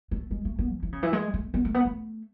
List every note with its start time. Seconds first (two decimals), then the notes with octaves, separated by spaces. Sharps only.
0.11 A3
0.31 G#3
0.45 A3
0.59 B3
0.72 E3
0.83 E3
0.92 C#3
1.03 E3
1.13 G#3
1.34 A3
1.54 B3
1.65 A3
1.74 B3
1.85 A3